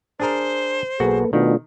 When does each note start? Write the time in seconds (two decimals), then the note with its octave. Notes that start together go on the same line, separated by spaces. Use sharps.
0.20 D4 G#4 A#4 C5
1.00 B1 A#3 F#4 G#4 A4 B4
1.33 B2 D#3 A3 D4 F4